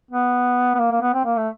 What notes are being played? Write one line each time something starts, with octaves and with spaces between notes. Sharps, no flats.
B3
B3
A#3
A#3
B3
C4
A#3
A3